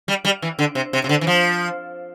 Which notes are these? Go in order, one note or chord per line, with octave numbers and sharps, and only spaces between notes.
G3
G3
E3
D3
C3
C3
C3
D3
E3
F3